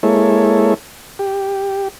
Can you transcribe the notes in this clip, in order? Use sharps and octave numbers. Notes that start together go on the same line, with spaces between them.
G#3 A#3 E4 A4 C#5
G4